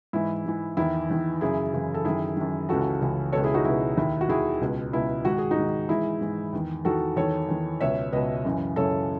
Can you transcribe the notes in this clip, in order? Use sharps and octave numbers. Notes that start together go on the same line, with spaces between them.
G#2 E3 E4
G#2 E3
E2 D#3 E4
E2 D#3
F#2 C#3 E3 E4 G#4
F#2 C#3 E3
A4
F#2 D#3 E4 G#4
F#2 D#3
C#2 C#3 E3 F#4 A4
C#2 C#3 E3
C#2 B2 A4 C#5
E4 G#4
D#4 F#4
C#2 B2 E4
D#2 D#3 E4
F#4
D#2 D#3 E4 G#4
C#2 B2
C#2 B2 E4
G#2 D#3 F#4
G#4
D#4 F#4
G#2 D#3
G#2 E3 E4 G#4
G#2 E3
E2 D#3
E2 D#3 F#4 A4
E2 D#3 A4 C#5
E2 D#3
C#2 B2 C#5 E5
C#2 B2 B4 D#5
F#2 C#3 E3
F#2 C#3 E3 A4 C#5